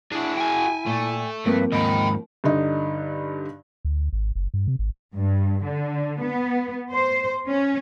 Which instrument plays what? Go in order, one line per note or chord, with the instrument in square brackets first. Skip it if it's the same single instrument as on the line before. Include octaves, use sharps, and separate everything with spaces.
[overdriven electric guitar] D4 [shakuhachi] E4 [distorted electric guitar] F#4 G#4
[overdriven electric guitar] G5 G#5
[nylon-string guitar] A#2 [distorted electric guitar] A3
[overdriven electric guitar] G2 [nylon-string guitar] F3 A#3 C4 [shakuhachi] B4
[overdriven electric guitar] D#2 G#2 [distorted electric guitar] D#5 G5 [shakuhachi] B5
[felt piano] G2 D3 D#4
[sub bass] D2
G#1
F#1
G2
C3
G#1
[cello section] G2
D3
B3
C5
C#4